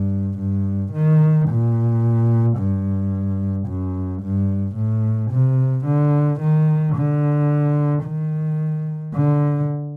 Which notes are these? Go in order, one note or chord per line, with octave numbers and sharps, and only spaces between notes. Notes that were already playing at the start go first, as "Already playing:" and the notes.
Already playing: G2
G2
D#3
A#2
G2
F#2
G2
A2
C3
D3
D#3
D3
D#3
D3